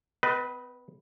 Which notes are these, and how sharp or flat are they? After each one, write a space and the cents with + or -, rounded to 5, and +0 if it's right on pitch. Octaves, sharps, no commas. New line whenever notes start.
B3 +45 B4 -10 D#5 +0